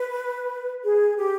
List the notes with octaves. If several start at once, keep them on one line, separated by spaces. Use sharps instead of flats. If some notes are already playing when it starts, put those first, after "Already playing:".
Already playing: B4
G#4
G4